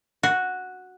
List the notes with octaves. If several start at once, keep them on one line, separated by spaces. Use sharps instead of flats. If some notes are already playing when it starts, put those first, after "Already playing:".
F#4